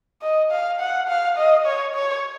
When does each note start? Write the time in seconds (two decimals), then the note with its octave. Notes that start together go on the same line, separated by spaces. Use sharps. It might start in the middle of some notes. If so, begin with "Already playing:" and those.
0.22 D#5
0.51 F5
0.80 F#5
1.08 F5
1.37 D#5
1.66 C#5
1.95 C#5